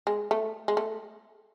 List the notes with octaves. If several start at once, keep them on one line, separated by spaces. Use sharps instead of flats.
G#3
A3
G#3
A3